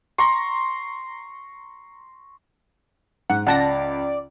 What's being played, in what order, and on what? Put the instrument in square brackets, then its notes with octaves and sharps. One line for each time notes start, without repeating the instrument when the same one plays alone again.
[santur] A#5 C6 C#6
[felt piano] G#2 [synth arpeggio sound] F#5
[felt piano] C#2 [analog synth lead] D5 [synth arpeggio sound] F#5 A5 A#6